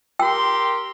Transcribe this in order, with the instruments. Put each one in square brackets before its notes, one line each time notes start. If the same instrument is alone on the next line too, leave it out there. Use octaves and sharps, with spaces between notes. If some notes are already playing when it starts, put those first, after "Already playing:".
[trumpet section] G4 A#4 C6 [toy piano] G5 E6